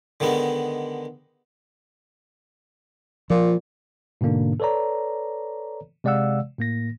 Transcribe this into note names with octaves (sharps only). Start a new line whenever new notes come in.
D3 D#3 G#3 B3 D#4
A#2 F3
G#2 B2 D3 A#3 D4
A4 B4 C#5 D5 A#5
C3 G#3 D5 F5 F#5 E6
A2 A#3 A#6